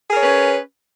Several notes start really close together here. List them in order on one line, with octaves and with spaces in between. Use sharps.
G#4 A#4 C#5 B4 C#4